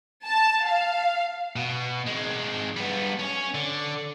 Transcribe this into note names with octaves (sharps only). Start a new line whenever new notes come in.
A5
F5
B2
D#3 G#3
G3 B3
C#4
D3